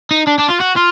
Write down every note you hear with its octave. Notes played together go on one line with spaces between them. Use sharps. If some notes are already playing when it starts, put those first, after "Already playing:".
D#4
D4
D4
F4
F#4
F4